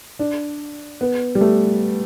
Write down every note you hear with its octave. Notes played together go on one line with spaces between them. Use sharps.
D4
B3
G3
A3